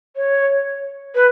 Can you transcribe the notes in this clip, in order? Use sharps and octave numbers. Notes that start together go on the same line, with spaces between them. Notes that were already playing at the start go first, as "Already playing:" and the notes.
C#5
B4